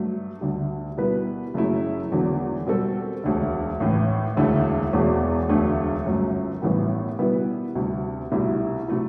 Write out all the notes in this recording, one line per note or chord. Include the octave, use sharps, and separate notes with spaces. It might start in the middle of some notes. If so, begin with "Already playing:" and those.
Already playing: G2 F#3 A3
D2 D3 G3
B2 G3 B3 E4 B4
F#1 F#2 F#3 A3 E4
E1 E2 D3 F#3
B2 G3 C4 F#4 A4
E1 D2 D3
A1 A2 E3
E1 D2 D3 A3 E4
E1 E2 B2 A3
E1 D2 D3 F#3 A3
G1 F#2 F#3 A3
A1 A2 E3 G3 B3
B2 G3 B3 E4 B4
D2 C3 G3
C2 B2 A3 E4 G4
C3 F#3 A3 E4